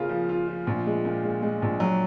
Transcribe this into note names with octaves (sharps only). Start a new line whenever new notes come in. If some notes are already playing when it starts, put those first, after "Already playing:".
Already playing: C#3 A#3 F4
F3
F4
F3
A#1
G#3
A#2
G#3
G#3
A#1
F#3